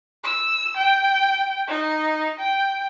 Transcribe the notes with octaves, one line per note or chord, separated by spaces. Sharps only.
E6
G5
D#4
G5